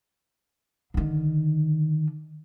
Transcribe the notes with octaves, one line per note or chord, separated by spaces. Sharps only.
D3 D#3